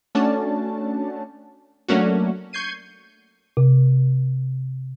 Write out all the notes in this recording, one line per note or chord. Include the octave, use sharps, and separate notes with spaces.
A3 C#4 D4 F#4 A5
F#3 A3 A#3 C#4 D4 F#4
C#6 G6 G#6 C7 D#7
C3